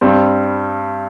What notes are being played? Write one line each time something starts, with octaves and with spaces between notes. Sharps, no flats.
G2 G3 C4